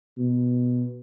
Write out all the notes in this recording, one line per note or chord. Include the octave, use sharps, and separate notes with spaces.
B2